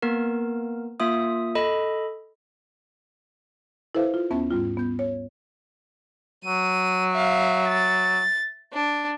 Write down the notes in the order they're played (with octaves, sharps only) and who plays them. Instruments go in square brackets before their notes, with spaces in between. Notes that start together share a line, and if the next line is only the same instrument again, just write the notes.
[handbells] A#3 B3 A#4
A#3 F4 E5 D#6
A4 D#5 B5
[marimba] E4 A4 B4 C5 E5 F5
F4
D#2 B3 C#4 E5 A5
G#2 G3 F4
B3 G6
C#5
[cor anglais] F#3 [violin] D#7
[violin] E5 F5
A6
D4